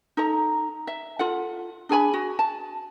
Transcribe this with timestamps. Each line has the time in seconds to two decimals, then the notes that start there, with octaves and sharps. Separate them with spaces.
0.17 D#4 A4 A#5
0.87 E5
1.19 F4 A4 F#5
1.89 D4 G#4 G#5 B5
2.14 F#4
2.39 A5